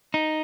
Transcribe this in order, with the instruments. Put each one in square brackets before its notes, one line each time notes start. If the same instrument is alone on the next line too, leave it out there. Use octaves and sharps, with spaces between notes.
[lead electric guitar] D#4